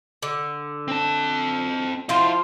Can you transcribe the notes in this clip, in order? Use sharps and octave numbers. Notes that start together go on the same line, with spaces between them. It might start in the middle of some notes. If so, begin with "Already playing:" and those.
D3
C4 A5
F3 E4 C5 F5